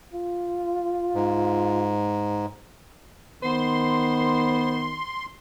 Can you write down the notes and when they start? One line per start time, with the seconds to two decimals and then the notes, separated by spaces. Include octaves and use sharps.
0.14 F4
1.15 G#2
3.43 D#3 B3 C5 C6